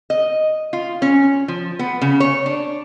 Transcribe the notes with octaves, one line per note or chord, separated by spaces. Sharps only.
D#5
F4
C#4
F3
B3
C#3
C#5
D4